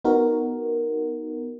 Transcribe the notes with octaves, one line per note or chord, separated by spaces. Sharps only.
B3 D#4 F#4 A#4